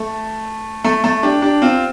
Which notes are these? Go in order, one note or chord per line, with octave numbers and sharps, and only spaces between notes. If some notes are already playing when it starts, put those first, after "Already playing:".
Already playing: A3
A3
A3
D4 G4
D4 G4
C4 F4